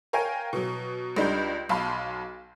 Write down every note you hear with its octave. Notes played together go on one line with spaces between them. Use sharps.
A#4 C#5 F5 G5 G#5
B2 F#3
C#2 G3 D4 D#4 G6
B1 F5 A5 B5 C6